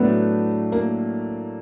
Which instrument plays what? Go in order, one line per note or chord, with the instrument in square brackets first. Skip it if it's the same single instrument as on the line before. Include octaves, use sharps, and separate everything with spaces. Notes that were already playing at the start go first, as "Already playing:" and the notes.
Already playing: [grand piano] A2 F#3 A3 D4 [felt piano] B3
[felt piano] A#3